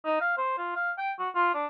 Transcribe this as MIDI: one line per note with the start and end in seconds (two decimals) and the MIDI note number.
0.05 0.20 63
0.21 0.35 77
0.37 0.57 72
0.58 0.72 65
0.75 0.91 77
0.98 1.11 79
1.19 1.29 66
1.35 1.51 65
1.54 1.66 62